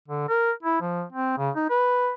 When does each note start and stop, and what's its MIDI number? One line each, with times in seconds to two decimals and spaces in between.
0.08 0.24 50
0.29 0.52 70
0.63 0.81 64
0.81 1.03 53
1.13 1.34 60
1.38 1.51 49
1.56 1.66 63
1.70 2.13 71